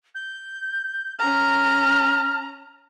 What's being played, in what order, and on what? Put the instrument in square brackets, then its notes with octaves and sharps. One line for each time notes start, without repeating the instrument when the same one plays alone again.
[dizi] G6
[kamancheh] C#4 A#5 [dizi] F6